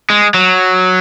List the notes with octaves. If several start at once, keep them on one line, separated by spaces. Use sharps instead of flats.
G#3
F#3